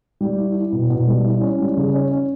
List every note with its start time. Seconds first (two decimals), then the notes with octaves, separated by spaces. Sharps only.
0.21 G3
0.37 E4
0.55 E4
0.72 B2
0.90 B2
1.07 G3
1.25 E4
1.41 C#4
1.60 G3
1.76 C#3
1.94 C#4
2.11 C#4